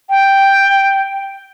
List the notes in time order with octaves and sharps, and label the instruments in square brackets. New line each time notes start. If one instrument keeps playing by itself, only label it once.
[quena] G5